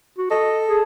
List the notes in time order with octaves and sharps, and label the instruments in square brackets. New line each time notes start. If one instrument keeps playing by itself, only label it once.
[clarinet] F#4
[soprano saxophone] A4 [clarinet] D#5
[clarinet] G#4